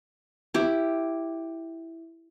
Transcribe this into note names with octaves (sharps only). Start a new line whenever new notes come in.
E4 G4